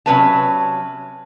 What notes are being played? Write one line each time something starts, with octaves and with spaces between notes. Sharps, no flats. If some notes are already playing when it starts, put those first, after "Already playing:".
C3 F#3 C#4 B4 F5 A5